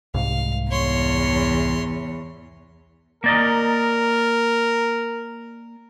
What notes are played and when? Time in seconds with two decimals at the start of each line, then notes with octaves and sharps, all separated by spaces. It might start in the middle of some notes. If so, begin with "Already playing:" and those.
0.14 C2 G#2 F5
0.71 E2 C#5 C6
3.24 A#3 A#4 D5 D#5